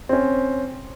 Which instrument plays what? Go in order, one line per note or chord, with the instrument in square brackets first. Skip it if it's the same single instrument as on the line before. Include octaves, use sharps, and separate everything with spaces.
[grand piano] C4 C#4